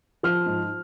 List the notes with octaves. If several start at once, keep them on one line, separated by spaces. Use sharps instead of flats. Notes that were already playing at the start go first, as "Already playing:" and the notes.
F3 F6
G#2